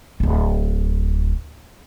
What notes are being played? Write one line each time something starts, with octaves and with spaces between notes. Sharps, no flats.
D1 G1